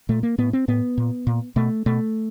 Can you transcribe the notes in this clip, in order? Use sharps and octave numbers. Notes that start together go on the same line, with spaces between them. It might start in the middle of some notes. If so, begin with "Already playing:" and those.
A#2 A3
A#3
A2 B3
C4
A2 B3
A#2
A#2
B2 A3
B2 A3